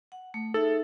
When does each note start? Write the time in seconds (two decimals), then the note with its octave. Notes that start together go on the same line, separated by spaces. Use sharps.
0.12 F#5
0.34 A3
0.54 D#4 G#4 A4 E5